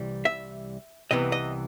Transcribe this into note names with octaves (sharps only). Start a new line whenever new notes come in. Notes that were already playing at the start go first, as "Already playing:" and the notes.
Already playing: C2 C3 E3 G3
E5
C2 C3 E3 B3 D#5
D#5